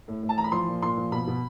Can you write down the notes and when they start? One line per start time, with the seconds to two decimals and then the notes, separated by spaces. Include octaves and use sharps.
0.08 A2
0.23 A2
0.29 A5
0.37 E3 A#5
0.44 B5
0.52 F3 C6
0.68 A#2
0.82 A#2 C6
0.97 F3
1.12 B2 B5
1.27 B2